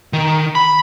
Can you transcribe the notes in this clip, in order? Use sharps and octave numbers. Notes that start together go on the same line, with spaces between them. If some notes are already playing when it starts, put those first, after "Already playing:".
D#3
B5